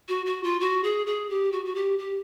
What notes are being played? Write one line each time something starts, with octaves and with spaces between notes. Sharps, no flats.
F#4
F#4
F4
F#4
G#4
G#4
G4
F#4
F#4
G4
G4